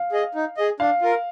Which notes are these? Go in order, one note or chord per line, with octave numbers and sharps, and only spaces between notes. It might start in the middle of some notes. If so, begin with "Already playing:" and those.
Already playing: F5
G#4 D#5
D#4
G#4 D#5
D4 F5
F4 A#4